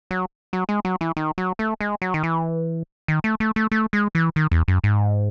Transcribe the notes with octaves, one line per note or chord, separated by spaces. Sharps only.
F#3
F#3
G#3
F#3
E3
D#3
F#3
A3
G#3
F#3
D#3
E3
D#3
A3
A3
A3
A3
G#3
E3
D#3
E2
F#2
G#2